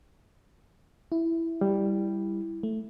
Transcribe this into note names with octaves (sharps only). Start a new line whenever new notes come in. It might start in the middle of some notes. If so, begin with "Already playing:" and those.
E4
G3
A3